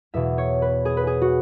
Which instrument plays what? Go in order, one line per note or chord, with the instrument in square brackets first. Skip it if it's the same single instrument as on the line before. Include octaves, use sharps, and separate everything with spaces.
[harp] E2 B2 E5
C#5
B4
G#4
B4
G#4
F#4